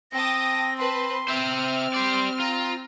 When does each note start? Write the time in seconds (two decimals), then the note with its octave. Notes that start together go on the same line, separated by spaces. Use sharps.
0.12 C4 G5 A5 D#6 A#6
0.78 B4 C5 A5 C6
1.28 C4 C5 E5 F6
1.94 G4 D5 C6
2.40 F4 A#5